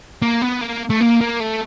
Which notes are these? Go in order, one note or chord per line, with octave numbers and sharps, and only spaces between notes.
A#3
B3
A#3
A3
A#3
A#3
A3